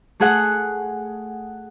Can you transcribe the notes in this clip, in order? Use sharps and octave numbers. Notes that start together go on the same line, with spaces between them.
A3 G#4 F#5